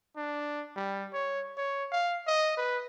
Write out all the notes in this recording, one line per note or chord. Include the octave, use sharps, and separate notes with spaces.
D4
G3
C#5
C#5
F5
D#5
B4